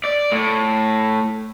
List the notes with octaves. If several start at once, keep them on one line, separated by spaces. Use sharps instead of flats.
D5
A2